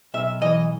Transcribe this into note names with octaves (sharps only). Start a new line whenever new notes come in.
B1 E5
E3 D#5